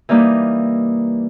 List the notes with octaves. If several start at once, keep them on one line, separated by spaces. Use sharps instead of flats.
E3 G3 A#3 D#4